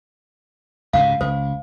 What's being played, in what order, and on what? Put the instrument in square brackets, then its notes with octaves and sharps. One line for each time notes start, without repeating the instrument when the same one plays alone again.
[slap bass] C#2 G#2 C3 [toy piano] F5
[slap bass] C#2 [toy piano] C5